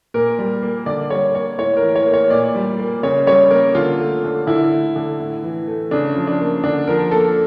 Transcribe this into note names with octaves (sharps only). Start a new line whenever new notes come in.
A#2 A#4
G3
A#3
D3 D5
G3 C#5
A#3 C#5
A2 C#5
A#4
E3
C#5
A#3
C#5
A#2 D5
G3
A#3
C#3 C#5
G3 C#5
A#3 A#4
D3 F4
A3
D3
D3 E4
A3
D3
A2
E3
A3
C#3 D4
F3
D4
A#3
D3 D4
F3 A#4
A#3 A4